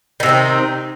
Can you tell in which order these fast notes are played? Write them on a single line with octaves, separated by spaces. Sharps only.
D#3 C3 C4 D#4